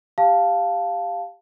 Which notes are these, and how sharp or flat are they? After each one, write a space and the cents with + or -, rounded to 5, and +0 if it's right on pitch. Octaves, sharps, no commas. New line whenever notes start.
G4 +10 F5 +0 A5 +0